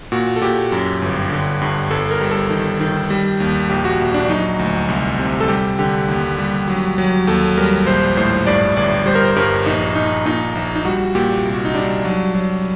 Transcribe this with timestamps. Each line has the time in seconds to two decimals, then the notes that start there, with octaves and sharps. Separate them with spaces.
0.12 A#2 F#4
0.36 A4
0.41 A#2 G4
0.72 F#2
1.02 G1
1.32 D3
1.62 G2
1.91 G1 A4
2.11 A#4
2.21 G3
2.31 A4
2.50 D#3
2.80 D#3
3.10 G3
3.40 D#2
3.70 A#1 G4
3.85 F#4
4.00 A#1
4.14 D4
4.29 F#3 D#4
4.59 D2
4.88 C2
5.19 C3
5.40 A4
5.48 G3 G4
5.79 D3 G4
6.08 D#2
6.38 G3
6.68 F#3
6.98 F#3
7.27 D#2 A4
7.57 G3 A#4
7.86 A#1 C5
8.17 A2 C5
8.47 G2 D5
8.77 G1 D5
9.06 G3 C5
9.15 A#4
9.25 C5
9.36 G2 A#4
9.66 A#1 D#4
9.95 A#1 D#4
10.25 A#2 D#4
10.55 A#1
10.76 D#4
10.85 G3 F#4
11.15 A#2 G4
11.45 C2
11.54 F#4
11.65 D#4
11.74 G3 D4
12.05 F#3
12.35 F#3